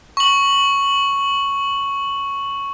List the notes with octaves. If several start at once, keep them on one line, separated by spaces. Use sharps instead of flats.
C#6 F#7